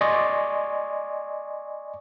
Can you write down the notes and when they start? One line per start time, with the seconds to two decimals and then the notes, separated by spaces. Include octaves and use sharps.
0.01 D5 D#5 G#5 C6 C#6